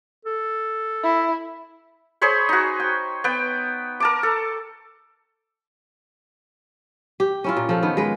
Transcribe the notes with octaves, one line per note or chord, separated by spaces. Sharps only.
A4
E4
G#4 C5 C#5 B5
D#4 F#4
G5
B3 G5
A#4 A5 D6
A4
G4
C#4 E4 F4
A#2
F3 A4
D#3 B3
G#3 B4